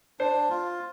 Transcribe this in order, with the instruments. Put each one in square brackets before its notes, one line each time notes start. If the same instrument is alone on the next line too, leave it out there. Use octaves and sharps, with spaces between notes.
[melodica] D4 [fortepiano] C5
[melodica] F4